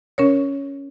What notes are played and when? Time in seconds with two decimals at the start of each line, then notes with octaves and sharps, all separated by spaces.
0.18 C#4 A#4 C#5